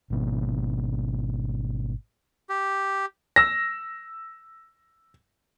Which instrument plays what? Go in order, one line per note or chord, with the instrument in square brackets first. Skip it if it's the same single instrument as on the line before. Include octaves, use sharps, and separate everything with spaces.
[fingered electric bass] G#1 B2 A#3
[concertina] G4
[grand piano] E6 A#6